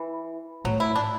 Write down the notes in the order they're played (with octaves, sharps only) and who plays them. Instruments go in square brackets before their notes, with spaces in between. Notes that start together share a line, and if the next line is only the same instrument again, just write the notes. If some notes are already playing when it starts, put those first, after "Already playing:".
Already playing: [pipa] E3
[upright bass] A2 [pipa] F#3
[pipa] E4
D4